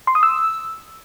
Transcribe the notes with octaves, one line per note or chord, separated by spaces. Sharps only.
C6
D#6
E6